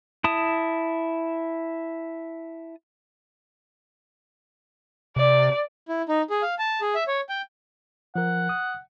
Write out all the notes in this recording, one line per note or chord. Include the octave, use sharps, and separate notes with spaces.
E4 A5 D#6
C3 D5
E4
D#4
G#4
F5
A5
G#4
E5
C#5
G5
F3 A#4 F#5
D#6